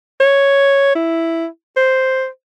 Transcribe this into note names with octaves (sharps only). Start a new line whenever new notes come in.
C#5
E4
C5